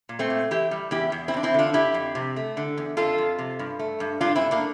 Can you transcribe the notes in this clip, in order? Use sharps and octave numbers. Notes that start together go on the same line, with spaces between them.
A#2
A3 C4
A#2
E3 E4 G4
G3
E2 E4 G4
E2
C4 E4
E2 D4
C4 E4
D3 D4 F4
F2 E4 G4
F2
C3
A3
D3
E2
F2 F4 A4
F2
C3
G2
A3
G2
G2 D4 F4
C4 E4
A3
A#3 D4